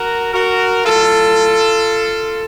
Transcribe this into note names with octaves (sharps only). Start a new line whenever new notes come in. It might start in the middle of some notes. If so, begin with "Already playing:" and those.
Already playing: F#4 A#4
F#4 A#4
A2 F#3 F4 A4